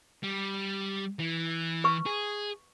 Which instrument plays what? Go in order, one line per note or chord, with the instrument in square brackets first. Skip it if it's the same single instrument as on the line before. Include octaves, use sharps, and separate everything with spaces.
[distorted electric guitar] G3
E3
[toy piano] B4 C#6
[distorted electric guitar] G#4